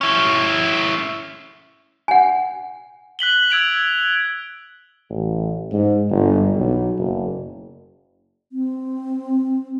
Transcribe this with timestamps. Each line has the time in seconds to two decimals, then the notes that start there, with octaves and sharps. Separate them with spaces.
0.01 C#4 E4
2.08 F#5 G#5
3.19 F#6 B6 F#7 G7
3.51 E6 G#6 D7 F7
5.10 A1
5.72 G#2
6.10 G1
6.56 B1
6.98 F#1
8.52 C4